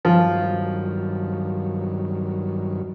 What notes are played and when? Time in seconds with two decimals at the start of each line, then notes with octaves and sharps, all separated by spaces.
0.05 G2 D#3 F3 F#3